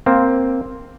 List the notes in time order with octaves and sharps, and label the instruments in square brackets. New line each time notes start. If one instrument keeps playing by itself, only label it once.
[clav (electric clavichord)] A#3 C4